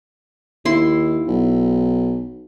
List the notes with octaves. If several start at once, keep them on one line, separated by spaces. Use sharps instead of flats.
D#2 E4 C6
B1